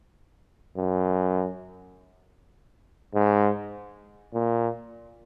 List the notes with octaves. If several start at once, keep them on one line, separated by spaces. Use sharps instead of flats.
F#2
G#2
A#2